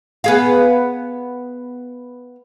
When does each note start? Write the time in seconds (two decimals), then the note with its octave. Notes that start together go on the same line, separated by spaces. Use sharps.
0.24 B3 G#4 F5